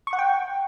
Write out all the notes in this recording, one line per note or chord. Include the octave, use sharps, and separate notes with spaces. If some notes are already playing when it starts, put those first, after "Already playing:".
C#6
F#5
G5